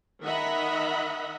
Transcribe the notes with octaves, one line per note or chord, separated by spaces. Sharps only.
D#3 D#5 E5 F#5 A#5 B5